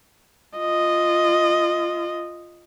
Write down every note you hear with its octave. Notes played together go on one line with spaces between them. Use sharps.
F4 D#5